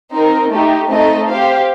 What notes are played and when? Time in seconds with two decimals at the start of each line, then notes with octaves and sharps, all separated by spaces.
0.12 C4 D#4 A#4
0.51 A3 D#4 G4
0.89 A3 C4 D#4 A4 D#5
1.28 G4 C5 F5